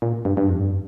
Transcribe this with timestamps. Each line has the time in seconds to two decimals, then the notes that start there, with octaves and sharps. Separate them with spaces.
0.02 A#2
0.25 G2
0.37 G2
0.49 F2
0.60 G2